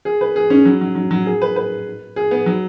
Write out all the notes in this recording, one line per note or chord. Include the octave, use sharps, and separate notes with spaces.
G#4
B4
G#4
C#4
F#3
F#3
F#3
F#3
G#4
B4
B4
G#4
B3
F#3